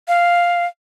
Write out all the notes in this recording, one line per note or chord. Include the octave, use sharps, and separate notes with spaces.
F5